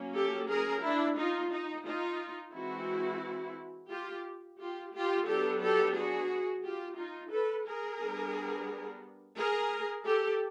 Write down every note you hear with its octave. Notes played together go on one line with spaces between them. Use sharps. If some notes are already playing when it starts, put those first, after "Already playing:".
Already playing: F#3 A#3 C#4
G4 A4
G#4 A#4
D4 E4
D#4 F4
D#4
D#4 F4
E3 G#3 C4 E4 F#4
F4 G4
F4 G4
F4 G4
F#3 B3 D4 G4 A4
G4 A4
F#4 G#4
F4 G4
D#4 F4
A4 B4
G#4 A#4
G3 B3 D4
G#4 A#4
G4 A4